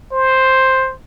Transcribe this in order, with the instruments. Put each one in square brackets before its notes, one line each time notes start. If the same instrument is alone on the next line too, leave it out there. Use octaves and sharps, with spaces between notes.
[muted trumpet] C5